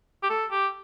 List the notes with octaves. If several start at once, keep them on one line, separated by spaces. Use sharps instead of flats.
G4
A4
G4